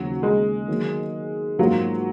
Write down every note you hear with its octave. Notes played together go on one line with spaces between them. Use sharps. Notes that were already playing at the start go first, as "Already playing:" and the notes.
Already playing: D#2 C#3 F3 F#3
G#3
D#3 F#3 A#3
G#2 F3 F#3 A#3 F4